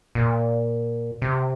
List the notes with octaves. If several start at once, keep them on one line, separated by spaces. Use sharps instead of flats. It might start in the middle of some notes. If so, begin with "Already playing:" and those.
A#2
C3